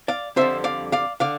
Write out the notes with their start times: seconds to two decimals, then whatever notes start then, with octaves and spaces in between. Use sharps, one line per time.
0.08 D5 F5
0.36 F2 D3 G3 C4 C5 E5
0.64 D5 F5
0.92 D5 F5
1.20 D3 D5 F5